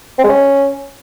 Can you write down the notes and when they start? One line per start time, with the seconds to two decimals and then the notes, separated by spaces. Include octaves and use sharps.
0.19 C4
0.24 G#3
0.29 C#4